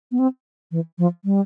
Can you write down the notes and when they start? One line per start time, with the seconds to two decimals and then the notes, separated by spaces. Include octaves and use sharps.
0.12 B3
0.19 C4
0.72 E3
0.98 F3
1.25 G3